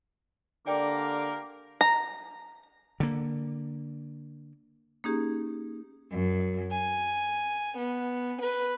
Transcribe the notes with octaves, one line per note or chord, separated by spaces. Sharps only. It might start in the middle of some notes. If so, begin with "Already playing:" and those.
D3 A#3 G4 A#4 D5 G5
A#5
D3 A#3
A#3 C#4 D#4 G4 G#4
F#2
G#5
B3
B4